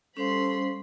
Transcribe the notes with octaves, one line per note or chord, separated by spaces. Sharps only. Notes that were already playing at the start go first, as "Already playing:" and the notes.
G3 C#4 A4 C5 F5 B5 C6